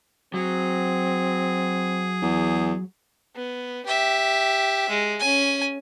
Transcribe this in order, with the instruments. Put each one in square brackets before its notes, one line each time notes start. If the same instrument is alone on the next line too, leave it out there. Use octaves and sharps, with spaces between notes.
[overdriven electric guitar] F#3 [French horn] C4 [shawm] G#4
[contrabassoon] E2
[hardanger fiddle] B3
G4 E5
G#3
C#4 G#5